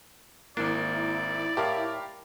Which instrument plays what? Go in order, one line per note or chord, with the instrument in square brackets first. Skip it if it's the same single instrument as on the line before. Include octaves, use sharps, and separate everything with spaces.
[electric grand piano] G#1 A#3 [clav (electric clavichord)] D4 [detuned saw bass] E4 [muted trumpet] D5
[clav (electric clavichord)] A2 [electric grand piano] G4 A#4 F5